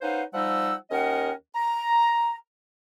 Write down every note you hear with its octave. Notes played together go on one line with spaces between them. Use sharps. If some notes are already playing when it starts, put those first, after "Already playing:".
C#4 D#4 B4 C5 F5 F#5
F3 G3 D#4 F#5 E6
D#2 C#4 A#4 D#5 F#5 G5
A#5